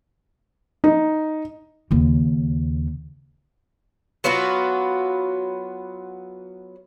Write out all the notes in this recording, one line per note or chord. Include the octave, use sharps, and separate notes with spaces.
D#4
D#2 C#3
F#3 B3 F4 F#4